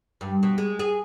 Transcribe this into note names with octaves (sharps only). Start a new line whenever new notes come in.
G2
B2
G#3
G#4